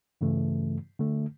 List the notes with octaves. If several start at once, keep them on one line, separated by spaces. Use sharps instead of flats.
G2 C#3 E3 A3
D3 A3